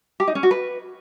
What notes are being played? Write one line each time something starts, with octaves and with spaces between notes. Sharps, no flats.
G4
D#4
C#4
F#4
B4